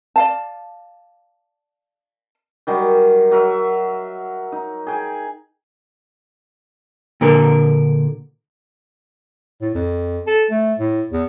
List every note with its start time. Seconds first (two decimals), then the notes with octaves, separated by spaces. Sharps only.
0.16 D5 F5 A5
2.67 D#3 F#3 G3 D#4
3.31 F#3 A#4 E5
4.52 D#4
4.87 G#4 G5 G#5
7.21 A#2 D3 A#4
9.61 A2
9.75 F2
10.27 A4
10.50 A3
10.79 A2
11.12 E2